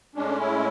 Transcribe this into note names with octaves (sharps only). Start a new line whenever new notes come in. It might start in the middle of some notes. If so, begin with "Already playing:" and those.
A2 G#3 C#4 D4
E4